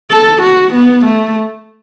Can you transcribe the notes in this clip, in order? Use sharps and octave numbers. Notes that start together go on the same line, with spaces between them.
A4
F#4
B3
A3